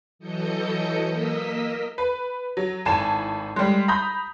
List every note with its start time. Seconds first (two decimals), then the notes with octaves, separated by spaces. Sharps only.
0.19 E3 F#3 A4 D#5 G6 C#7
1.06 A#3 A#4 D#5 E6 B6
1.98 B4
2.57 F#3
2.85 G#1 A2 G#5 A5 E7
3.56 G3 G#3
3.88 A#5 B5 D#6 G6